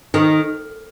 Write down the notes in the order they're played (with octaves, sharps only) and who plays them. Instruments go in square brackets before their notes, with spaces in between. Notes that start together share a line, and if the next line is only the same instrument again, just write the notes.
[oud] D#3